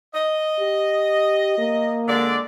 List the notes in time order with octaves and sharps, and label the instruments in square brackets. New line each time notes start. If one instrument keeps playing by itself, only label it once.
[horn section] D#5
[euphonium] G4
A#3
[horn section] D3 G#3 D5